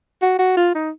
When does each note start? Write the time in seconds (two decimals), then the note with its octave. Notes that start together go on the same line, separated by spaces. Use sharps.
0.22 F#4
0.39 F#4
0.57 F4
0.75 D#4